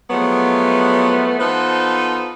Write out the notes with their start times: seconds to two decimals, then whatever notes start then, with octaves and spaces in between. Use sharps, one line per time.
0.10 F3 F#3 G#3 A3 B3
1.39 F3 B3 D#4 A4 B4 C5